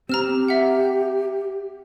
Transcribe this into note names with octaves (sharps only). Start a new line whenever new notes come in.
C4 G4 A#5 F6 E7
E5 F#5